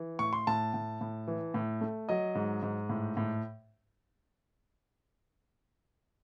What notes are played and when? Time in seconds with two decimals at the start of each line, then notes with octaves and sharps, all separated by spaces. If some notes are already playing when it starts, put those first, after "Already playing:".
Already playing: E3
0.19 A2 C#6
0.33 C6
0.47 A2 A5
0.74 A2
1.01 A2
1.28 E3
1.54 A2
1.81 A3
2.09 F#3 D#5
2.35 G#2
2.62 G#2
2.89 A2
3.17 A2